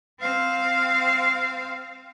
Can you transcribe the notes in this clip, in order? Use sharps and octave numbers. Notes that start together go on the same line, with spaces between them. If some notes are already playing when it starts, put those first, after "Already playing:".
C4 F5